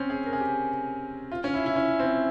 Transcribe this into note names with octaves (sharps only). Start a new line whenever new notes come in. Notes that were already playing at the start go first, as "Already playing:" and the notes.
Already playing: C4 C#4
G#4
A#4
G#4
G4
F4
C#4
E4
E4
C#4
C4